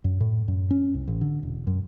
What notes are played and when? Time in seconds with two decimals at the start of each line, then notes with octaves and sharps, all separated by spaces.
0.04 F#2
0.21 A2
0.48 F#2
0.71 C#4
0.94 C2
1.08 A1
1.21 D3
1.43 E1
1.67 F#2